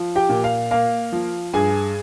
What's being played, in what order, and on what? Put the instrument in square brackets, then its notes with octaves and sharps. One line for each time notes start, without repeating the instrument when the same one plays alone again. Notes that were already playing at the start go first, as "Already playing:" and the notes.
Already playing: [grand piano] F3
G4 G5
A#2
F5
A#3 F5
F3
G2 G#4 G#5